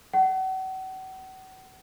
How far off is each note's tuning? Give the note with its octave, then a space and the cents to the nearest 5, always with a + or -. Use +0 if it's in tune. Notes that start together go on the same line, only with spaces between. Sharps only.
F#5 +35